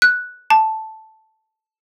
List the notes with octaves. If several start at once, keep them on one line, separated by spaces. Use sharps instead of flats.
F#6
A5